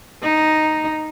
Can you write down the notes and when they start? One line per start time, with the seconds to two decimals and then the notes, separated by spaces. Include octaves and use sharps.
0.23 D#4